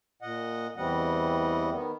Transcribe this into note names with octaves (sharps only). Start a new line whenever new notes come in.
A#2 D#5 F#5
E2 E3 G3 C4 D#5 F#5
D#3 B3